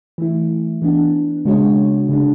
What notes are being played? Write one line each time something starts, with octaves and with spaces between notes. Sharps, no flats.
E3 A3 E4
E3 B3 D4
C#3 G#3 D4 F#4 C#5
C#3 G#3 D4